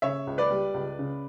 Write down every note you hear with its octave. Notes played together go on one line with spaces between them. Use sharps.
C#3 C#5 E5
C#2
B4 D5
G3
C#2
C#3